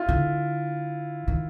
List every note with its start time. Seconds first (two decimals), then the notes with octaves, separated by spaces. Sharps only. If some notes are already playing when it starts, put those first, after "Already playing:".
Already playing: E4 F4
0.09 D3
1.28 D#3